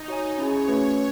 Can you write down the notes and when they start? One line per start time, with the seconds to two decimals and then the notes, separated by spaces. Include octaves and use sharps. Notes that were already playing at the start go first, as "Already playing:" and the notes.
Already playing: D#4
0.08 F#4 C#5 G#5
0.38 C#4 E4 G#4 C#5
0.68 A3 C#4 F#4 B4